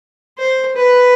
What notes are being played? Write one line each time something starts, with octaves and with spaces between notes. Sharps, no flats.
C5
B4